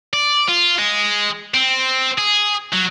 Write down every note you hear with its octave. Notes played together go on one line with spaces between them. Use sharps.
D5
F4
G#3
C4
G#4
F#3